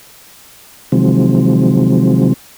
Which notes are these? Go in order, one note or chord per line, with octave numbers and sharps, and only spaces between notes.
C3 D#3 F3 F#3 G#3 C4